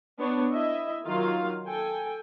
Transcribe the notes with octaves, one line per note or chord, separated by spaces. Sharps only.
B3 D4 C#5
E4 D#5 E5
D#3 F#3 F4 F5
A4 G5 G#5